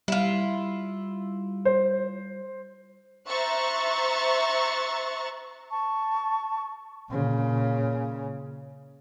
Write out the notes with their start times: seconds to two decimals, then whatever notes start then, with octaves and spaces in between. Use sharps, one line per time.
0.08 G3 E4 F4
1.65 C5
3.28 C5 E5 A#5 C#6 F#6 A6
5.71 A5 C#6
7.10 A#2 C#3